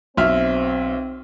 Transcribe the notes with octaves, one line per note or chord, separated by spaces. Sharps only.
B1 C4 E5 F6